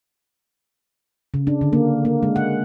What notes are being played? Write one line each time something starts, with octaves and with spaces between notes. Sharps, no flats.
C#3
D4
D3
A#3
A#3
G#3
F#5